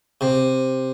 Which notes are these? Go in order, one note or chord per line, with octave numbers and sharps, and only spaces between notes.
C3